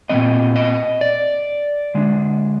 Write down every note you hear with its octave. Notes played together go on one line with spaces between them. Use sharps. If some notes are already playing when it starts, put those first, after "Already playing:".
A#2 G3 C4 D#5
D#5
D5
D3 G#3 D4